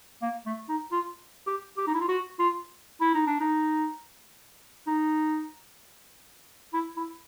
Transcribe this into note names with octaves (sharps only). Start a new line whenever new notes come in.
A#3
A3
D#4
F4
G4
G4
D#4
E4
F4
F#4
F4
E4
D#4
D4
D#4
D#4
E4
E4